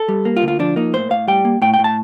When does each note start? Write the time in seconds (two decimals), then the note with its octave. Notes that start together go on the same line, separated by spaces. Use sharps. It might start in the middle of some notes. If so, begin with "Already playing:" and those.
Already playing: A4
0.08 G3
0.25 A#3
0.36 F4
0.42 D2
0.48 F4
0.59 F3 D4
0.76 A#3 D#4
0.93 A2 C5
1.10 A2 F5
1.28 G3 G5
1.45 A#3
1.62 A2 G5
1.74 G5
1.79 A2
1.84 A5